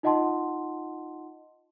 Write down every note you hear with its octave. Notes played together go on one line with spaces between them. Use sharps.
D#4 F4 D#5 F#5 A5 C6